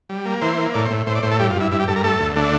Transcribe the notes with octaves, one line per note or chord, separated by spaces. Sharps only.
G3
A#3
E3 C5
A#3
A2 D5
C5
A2
A2 C5
D5
A2 C5
A4
G2 G4
F4
G2
E4
G2 E4
G4
G2 A4
A#4
A3 A4
D2
A3 D4